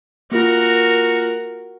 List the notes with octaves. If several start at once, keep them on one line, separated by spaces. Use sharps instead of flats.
A#3 F4 F#4 A#4